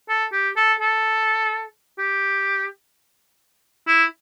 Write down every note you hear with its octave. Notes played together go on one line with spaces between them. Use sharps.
A4
G4
A4
A4
G4
E4